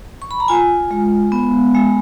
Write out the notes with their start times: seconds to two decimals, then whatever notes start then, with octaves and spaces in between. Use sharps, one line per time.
0.22 C#6
0.31 B5
0.40 A#5
0.48 F4 G#5
0.91 G#3
1.32 B3
1.74 G#3